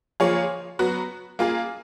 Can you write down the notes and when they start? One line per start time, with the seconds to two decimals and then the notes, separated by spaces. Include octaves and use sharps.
0.20 F3 A#3 F4 G#4 C#5
0.79 F#3 B3 F#4
1.39 A#3 F4 G#4